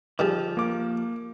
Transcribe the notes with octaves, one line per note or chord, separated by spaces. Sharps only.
D#3 F3 G3 G#4
A#3 D6